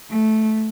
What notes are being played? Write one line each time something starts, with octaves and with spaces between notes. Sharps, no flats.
A3